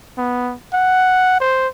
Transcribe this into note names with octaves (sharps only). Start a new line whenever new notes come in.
B3
F#5
C5